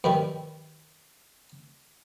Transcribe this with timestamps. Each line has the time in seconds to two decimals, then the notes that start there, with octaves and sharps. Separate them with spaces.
0.04 G2 D#3 G3